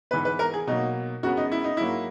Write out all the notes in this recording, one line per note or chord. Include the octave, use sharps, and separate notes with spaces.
G#2 E3 B3 B4
B4
A#4
G#4
B2 F#3 A#3 D#4
F#2 C#3 G#3 B3 F#4
D#4
E4
D#4
G#2 F#3 A#3 E4